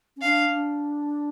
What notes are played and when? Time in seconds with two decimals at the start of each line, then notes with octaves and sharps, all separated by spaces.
0.16 C#4
0.22 D4 F5
0.50 D4